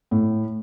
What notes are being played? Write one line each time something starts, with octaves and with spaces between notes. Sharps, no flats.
A2